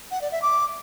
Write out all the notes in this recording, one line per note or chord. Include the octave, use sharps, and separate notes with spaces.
F#5
D5
E5
D6